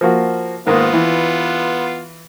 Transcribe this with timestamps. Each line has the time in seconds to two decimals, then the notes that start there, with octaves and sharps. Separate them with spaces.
0.01 F3 A#3 F#4
0.67 G#2 D#3 A#3 B3 F4
0.93 E3